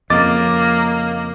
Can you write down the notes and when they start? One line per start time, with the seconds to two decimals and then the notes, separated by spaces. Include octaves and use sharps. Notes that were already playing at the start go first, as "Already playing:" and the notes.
0.10 F2 C#3 A#3 D#5 D6 A6